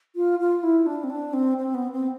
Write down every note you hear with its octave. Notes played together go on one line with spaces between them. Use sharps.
F4
F4
E4
D4
C4
D4
C4
C4
B3
C4